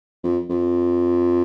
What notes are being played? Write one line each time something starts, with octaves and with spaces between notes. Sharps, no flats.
F2
F2